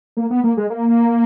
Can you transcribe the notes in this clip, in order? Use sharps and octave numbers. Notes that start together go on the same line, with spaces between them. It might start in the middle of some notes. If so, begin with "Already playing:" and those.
A#3
B3
A#3
G#3
A#3